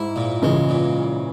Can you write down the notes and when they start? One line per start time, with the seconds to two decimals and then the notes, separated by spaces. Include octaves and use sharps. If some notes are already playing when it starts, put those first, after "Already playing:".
Already playing: G#2 E4
0.16 A#2
0.42 C#3 E3 G#3
0.69 A#2